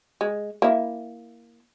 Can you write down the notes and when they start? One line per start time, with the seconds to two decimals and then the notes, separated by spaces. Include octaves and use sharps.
0.21 G#3
0.62 A#3 E4